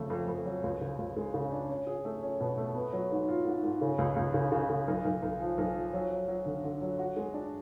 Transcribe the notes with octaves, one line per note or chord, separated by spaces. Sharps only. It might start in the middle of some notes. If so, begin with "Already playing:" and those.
Already playing: F2 C#3 A3
F2
F2
F#3
C#2
C#3
C#2
G#3
C#3
D4
C#4
G#4
A3
C#4
B2
A3
B3
F#3
G#2
F4
G#2
G#2
C#3
C#2
C#2
C#3
C#3
C#3
B1
B1
B1
F3
B1
F3
F#3
F#3
F#3
D3
D3
F#3
F#4
G#3
D4